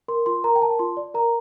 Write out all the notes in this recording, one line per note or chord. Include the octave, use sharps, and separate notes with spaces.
A#4 C6
F4 C6
A#4 A#5
G5
A#4 A5
F4 C6
D5
A#4 A#5